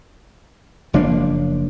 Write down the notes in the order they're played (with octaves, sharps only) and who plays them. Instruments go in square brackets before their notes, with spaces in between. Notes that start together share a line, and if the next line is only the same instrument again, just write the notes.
[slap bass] F#1 F3 A#3 D4